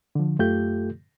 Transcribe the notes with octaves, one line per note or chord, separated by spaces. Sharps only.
D3 F3
F#2 A3 F4 G4 A4 G6